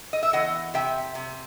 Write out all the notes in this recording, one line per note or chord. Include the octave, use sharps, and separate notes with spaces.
D#5
E5
E2 D#5 F#5
C3 E5 G5
C3